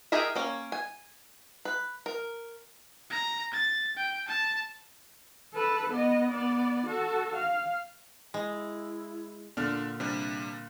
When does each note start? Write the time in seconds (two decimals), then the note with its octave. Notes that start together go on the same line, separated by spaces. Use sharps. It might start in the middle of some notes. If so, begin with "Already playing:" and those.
0.12 G4 G#4 A#4 D#5 E5
0.36 A#3 C#4
0.72 G#5
1.65 B4
2.06 A#4
3.10 A#5
3.53 A6
3.97 G5
4.28 A5
5.54 A4 B4
5.89 B3 D#5
6.31 B3 D5
6.86 F#4 A4
7.36 F5
8.34 G#3 E4
9.57 A#2 D3 D4 F6
10.00 C3 G3 D4